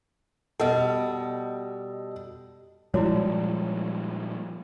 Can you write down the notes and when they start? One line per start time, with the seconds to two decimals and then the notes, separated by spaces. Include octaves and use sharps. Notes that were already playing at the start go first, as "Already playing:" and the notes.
0.59 B2 G3 A4 D#5
2.94 A#2 F3 G3 G#3 E4 F#4 C#5 D5